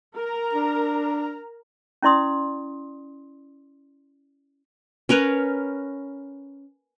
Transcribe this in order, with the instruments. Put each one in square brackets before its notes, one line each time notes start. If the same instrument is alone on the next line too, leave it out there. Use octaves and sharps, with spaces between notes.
[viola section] A#4 A#5
[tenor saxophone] D4
[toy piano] C#4 E4 D5 C6 D#6
[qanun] C#4 A#4 B4 C#5